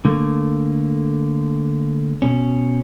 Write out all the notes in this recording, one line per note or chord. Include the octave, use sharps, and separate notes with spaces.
D3 A3 A#3
B2 C#4